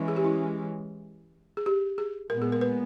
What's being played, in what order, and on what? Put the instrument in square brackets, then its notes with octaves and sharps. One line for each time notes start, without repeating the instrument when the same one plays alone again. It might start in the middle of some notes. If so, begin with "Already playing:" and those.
Already playing: [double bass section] E3 G#3 C#4
[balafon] G#4
G4
E4
G#4
G4
G#4
[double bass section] A#2 G#3 B3 [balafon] A#4
[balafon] G#4
A#4
B4